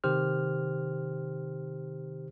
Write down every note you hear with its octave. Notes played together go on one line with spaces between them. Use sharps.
C3 D#3 G4 C5 F6